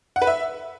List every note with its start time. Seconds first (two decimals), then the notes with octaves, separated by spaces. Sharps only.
0.16 F#5
0.22 B4
0.27 E5